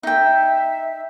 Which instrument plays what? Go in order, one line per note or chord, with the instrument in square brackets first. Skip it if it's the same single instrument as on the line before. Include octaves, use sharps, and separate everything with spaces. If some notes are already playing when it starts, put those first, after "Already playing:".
[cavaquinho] D#4 G5 [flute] E5